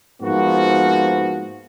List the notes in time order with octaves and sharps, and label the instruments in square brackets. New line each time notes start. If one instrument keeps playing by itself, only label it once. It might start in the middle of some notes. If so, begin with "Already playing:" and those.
[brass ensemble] G#2 F3 A#3 B3 F#4